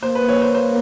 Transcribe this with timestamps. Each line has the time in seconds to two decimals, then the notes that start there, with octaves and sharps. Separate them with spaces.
0.02 A#3 C5
0.15 B4
0.28 C#5
0.42 C5
0.55 C5